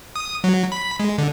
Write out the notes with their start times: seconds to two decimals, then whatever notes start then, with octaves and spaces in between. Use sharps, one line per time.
0.16 D#6
0.44 F#3
0.72 B5
1.00 G#3
1.18 D3